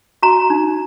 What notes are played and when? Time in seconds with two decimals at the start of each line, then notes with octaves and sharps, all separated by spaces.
0.22 F#4 A#5
0.50 D#4